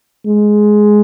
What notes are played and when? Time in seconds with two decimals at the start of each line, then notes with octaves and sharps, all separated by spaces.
0.26 G#3